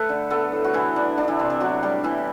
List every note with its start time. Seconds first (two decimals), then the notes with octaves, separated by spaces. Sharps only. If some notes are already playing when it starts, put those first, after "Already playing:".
Already playing: A3 A4 B4
0.09 D3
0.30 A3 B3 A4
0.52 A2
0.64 F#4
0.74 E3 B3 E4
0.96 D3 D4
1.17 B3 D4
1.28 E3 E4
1.39 C3 C4
1.50 D4
1.60 F#3 B3 F#4
1.83 A2 G3 G4
2.04 E3 B3 E4